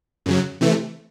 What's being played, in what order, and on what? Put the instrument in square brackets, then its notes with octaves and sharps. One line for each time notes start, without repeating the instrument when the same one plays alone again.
[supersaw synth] F#2 C#3 F#3
C3 E3 A3